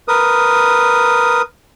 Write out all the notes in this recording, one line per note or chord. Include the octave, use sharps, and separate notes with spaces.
A#4 B4 D#6